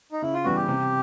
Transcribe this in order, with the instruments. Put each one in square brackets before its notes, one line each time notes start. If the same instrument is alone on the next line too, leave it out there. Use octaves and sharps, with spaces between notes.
[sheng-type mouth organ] D#4
[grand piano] C#3 [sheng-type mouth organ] E4
[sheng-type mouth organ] F4
[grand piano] E3 G3 B3 [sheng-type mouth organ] F#4
[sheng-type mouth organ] G4
[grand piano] C3